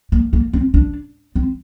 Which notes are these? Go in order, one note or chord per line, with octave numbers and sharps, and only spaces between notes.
A#3
A#3
C4
D4
C4